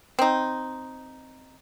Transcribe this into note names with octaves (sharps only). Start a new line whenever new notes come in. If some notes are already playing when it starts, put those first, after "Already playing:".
C4 D#4